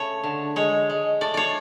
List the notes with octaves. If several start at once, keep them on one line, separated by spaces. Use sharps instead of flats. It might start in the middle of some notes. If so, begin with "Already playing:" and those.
Already playing: C#3 A3 C#5
D3
G#3 C#5
G#3
A3 D5
C#5 D5